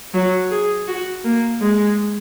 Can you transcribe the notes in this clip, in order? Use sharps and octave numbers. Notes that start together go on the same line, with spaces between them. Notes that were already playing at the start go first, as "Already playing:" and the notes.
F#3
G#4
F#4
A#3
G#3